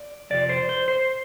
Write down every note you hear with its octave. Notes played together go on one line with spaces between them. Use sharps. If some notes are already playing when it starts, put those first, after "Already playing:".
Already playing: D5
F2 C3 F3 D5
C5
C5
C5